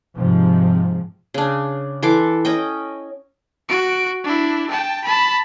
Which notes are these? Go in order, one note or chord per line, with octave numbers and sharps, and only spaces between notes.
G#2 C3 F3
C#3 D4
E3 A4 C6 D6
C#4 D#5 G5
F#4 D7
D4 E4
G5 A5
A5 B5